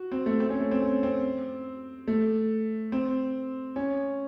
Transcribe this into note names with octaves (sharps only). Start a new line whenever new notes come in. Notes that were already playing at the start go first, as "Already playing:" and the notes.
Already playing: F#4
C4
A3
C4
C#4
A3
C4
C#4
C4
A3
C4
C#4